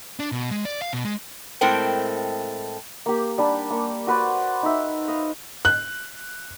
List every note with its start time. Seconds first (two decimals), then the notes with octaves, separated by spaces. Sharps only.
0.19 D4
0.32 B2
0.51 G#3
0.65 D5
0.82 F5
0.93 B2
1.05 G#3
1.61 A2 G#3 A3 C4 A#4 G5
3.06 A#3 G4
3.38 G3 D4 G4
3.70 A#3 C#6
4.07 F#4 B4 C5 D5
4.63 D#4 E5
5.08 D#5 F5
5.65 F#6